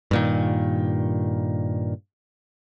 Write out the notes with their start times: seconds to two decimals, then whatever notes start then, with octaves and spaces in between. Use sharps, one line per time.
0.11 G2 A#2 D#3